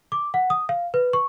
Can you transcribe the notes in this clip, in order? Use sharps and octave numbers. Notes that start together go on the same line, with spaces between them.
D6
F#5
D#6
F5
B4
C#6